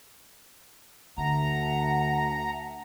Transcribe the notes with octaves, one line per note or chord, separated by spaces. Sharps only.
D2 D3 E5 F#5 A5 A#5